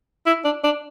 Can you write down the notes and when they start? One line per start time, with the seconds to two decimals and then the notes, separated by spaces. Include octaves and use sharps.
0.26 E4
0.44 D4
0.64 D4